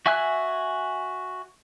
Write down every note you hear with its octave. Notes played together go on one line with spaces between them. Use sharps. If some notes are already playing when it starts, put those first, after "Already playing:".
F#4 E5 G#5 E6 F#6